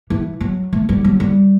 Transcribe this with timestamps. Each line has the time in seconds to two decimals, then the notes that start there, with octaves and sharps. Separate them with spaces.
0.10 E3
0.40 F#3
0.73 A3
0.89 G3
1.04 F#3
1.20 G3